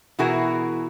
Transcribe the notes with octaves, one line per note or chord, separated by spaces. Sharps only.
B2 E3 E4 F#4 G#4 A#4